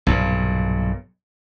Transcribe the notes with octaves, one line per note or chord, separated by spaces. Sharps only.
B1 G2 A#2